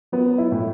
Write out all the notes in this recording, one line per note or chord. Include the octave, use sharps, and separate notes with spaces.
F#3 B3
E4
A2